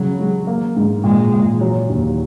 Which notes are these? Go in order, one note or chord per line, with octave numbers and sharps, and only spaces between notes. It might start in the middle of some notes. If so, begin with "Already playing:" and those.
Already playing: C#3 F#3
G#3
A#3
G#2
A#2 G#3
A#2
F#3
D#2